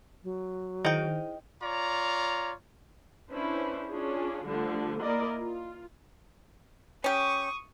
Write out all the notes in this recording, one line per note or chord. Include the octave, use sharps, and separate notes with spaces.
F#3
D#3 D#4 E4 G#4 C5 G5
F4 C#5 D5 A#5
C#4 D4 E4 B4 C5
C#4 D4 F4 G#4
D3 F3 G3 A3
A#3 E4 A#4 D5 D#5
F4
C#4 G4 C#6 D#6